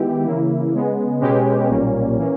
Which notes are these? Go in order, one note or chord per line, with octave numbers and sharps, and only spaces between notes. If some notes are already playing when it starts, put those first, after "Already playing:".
Already playing: D#3 G#3 B3 E4 G4
C#3 E3 A#3 E4
C#3 G#3 B3
B2 G#3 C#4 G4 B4
B1 A#2 G3 A#3 C#4
E3 A#3 C#4